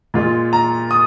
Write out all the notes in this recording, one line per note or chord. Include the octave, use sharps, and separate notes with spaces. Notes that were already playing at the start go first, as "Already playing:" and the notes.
A#2 G#3 F4
A#5
D#6